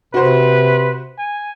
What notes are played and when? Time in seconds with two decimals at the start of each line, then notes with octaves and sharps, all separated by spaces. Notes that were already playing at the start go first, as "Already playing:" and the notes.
0.14 C3 F#4 B4 C5
1.19 G#5